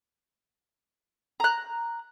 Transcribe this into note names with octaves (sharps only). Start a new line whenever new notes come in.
A#5 F#6